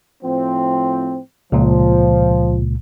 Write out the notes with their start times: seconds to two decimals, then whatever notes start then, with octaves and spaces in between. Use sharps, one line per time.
0.23 A2 F3 C4
1.52 C#2 A#2 F3